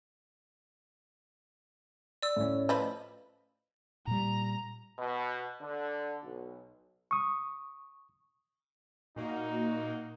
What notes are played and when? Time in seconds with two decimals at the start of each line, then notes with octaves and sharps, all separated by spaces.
2.23 D5 E6
2.36 A2 C#4
2.69 F3 B4 D#5
4.07 A#2 G3 A#5
4.99 B2
5.61 D3
6.24 B1
7.11 C#6 D#6
9.16 A#2 A#3 D#4 F#4